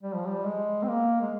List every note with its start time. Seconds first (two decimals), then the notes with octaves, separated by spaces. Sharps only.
0.03 G3
0.15 F3
0.27 G3
0.45 G#3
0.83 C4
0.88 A#3
1.21 G#3